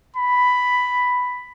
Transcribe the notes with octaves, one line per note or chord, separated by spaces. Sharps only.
B5